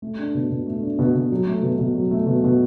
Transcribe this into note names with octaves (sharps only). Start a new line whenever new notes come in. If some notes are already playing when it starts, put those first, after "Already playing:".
A3
D4
B2
B2
A3
D4
B2
B2
F#3
A3
B2
B2
F#3
A3
B2
B2